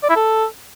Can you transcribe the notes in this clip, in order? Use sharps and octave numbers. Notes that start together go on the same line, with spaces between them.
D5
E4
A4